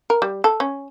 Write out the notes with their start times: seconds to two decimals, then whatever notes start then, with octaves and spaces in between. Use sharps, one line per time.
0.10 A#4
0.22 G3
0.44 A4
0.60 C#4